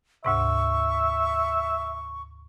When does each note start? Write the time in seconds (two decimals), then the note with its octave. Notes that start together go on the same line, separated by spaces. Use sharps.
0.25 D2 G#2 C3 E5 C#6